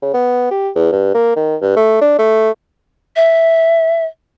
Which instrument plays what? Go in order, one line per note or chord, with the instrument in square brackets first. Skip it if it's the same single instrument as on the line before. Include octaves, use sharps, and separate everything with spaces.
[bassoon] C#3
B3
G4
E2
G2
A#3
D#3
G2
A3
D4
A3
[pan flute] E5